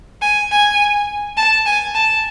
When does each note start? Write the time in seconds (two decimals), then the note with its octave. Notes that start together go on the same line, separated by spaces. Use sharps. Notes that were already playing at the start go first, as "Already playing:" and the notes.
0.22 G#5
0.52 G#5
1.37 A5
1.66 G#5
1.95 A5